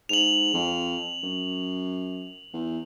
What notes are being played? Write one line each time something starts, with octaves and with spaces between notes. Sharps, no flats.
G#2 F7 F#7
F2
F#2
E2